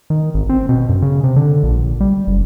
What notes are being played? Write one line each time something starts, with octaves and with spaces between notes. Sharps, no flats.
D#3
G#1
C4
B2
F#2
C#3
C3
D3
A#1
G3
F#1